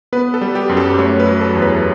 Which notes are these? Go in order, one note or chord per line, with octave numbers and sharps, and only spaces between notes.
B3 B4
A4
G3
G4
F#2
A4
A3 C#5
B4
F#3
A4
E2
B4